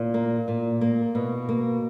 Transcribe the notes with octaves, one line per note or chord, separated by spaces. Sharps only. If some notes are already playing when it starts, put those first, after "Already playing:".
Already playing: A#2
A#3
A#2
A#3
B2
A#3